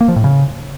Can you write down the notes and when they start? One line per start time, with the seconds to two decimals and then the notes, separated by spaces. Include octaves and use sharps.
0.01 A#3
0.08 F3
0.16 A2
0.24 C#3